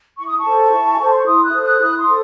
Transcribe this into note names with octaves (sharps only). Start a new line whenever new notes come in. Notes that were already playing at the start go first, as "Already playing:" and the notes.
E4 C#6
D#6
A5 C#6
A4 C5
E4
G#5
A4 C5 A5
C6
C#6
E4 C6 D#6
D#6 F#6
A4 C5
D#6 F#6
E4 D#6 F#6
C6 D#6
A4 C5